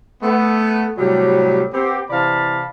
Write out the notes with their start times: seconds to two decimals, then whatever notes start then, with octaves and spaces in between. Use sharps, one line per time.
0.22 A3 B3
0.98 A2 C3 F#3 G3
1.73 B3 C4 G4
2.10 C3 E3 D5 F5 A5 B5